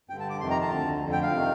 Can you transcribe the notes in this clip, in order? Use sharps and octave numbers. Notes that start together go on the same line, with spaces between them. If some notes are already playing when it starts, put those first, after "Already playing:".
G2 D3 G5
A5
D6
F2 C3 D#3 C6
A#5
A5
D2 D3
F2 D3
G5
F5
C3 D#3